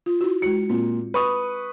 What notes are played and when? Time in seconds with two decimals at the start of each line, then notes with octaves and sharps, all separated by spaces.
0.06 F4
0.21 E4 F#4
0.42 G#3 E4 F#4 C#7
0.70 A#2 C4 F4
1.14 B4 C#6 D#6